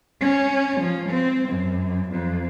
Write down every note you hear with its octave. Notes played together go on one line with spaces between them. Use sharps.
C#4
F3
C4
F#2
F2